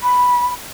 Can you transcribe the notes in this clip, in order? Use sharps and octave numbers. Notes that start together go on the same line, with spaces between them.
B5